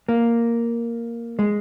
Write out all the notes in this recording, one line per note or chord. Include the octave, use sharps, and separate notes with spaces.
A#3
G#3